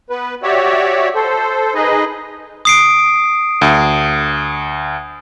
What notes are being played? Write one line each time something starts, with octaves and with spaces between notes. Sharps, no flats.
B3 B4
F#4 G4 C#5 D5 E5
A4 C5
D#4 G#4 B4 D#5
D#6 C7 D7
D2